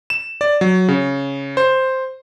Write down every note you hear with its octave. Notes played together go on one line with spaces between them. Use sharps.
E7
D5
F#3
C#3
C5